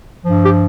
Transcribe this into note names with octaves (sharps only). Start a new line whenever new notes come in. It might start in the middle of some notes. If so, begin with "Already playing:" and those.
G2 F3
G4